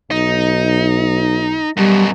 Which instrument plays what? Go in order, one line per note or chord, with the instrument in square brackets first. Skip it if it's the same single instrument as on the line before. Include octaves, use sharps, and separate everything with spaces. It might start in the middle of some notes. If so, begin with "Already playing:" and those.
[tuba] B1 [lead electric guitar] D#4
[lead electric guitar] F#2 B2 [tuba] G3